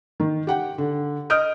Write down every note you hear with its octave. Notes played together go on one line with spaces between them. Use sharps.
D#3
G4 F#5 G5
D3
D#5 D#6 F6 G6 D7